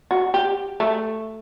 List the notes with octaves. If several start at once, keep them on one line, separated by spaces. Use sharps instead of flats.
F#4
G4
A3